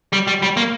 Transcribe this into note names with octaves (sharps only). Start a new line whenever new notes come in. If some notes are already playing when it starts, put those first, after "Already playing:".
G3
G3
G3
A#3